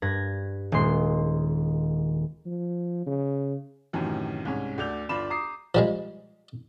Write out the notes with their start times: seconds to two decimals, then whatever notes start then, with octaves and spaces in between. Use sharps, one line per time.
0.02 G2 B4 G#6 A#6
0.72 D#1 G#3 C6 C7
2.46 F3
3.07 C#3
3.93 F#2 A2 C3 D#3 E3
4.45 C2 G#2 C#4 C#5
4.78 D2 D3 D5 G6 F7
5.09 G1 F4 D5 B5 E7
5.30 A#5 D6 D#6 C7
5.75 F3 G3 G#3